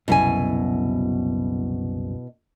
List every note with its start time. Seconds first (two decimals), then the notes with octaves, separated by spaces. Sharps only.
0.08 F#1 C2 F#2 B2 E4 G#5